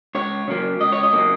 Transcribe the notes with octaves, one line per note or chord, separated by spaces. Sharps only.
C#2 C#5
C#3 F#3 A#3
C#2 D#5
C#5
D#5
C#3 F#3 A#3